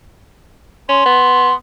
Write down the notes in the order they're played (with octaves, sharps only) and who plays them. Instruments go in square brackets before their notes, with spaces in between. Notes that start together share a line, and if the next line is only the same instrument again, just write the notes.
[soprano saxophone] C#4 [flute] C6
[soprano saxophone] B3